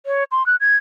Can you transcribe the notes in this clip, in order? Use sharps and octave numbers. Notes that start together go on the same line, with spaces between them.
C#5
C6
F#6
G#6